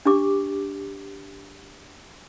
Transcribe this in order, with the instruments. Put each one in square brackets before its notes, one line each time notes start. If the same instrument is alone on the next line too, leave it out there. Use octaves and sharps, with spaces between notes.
[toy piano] D4 G4 D6